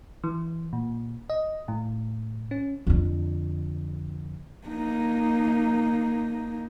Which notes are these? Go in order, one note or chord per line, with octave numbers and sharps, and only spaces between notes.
E3
A#2
D#5
A2
C#4
F2 D3
A#3 D#4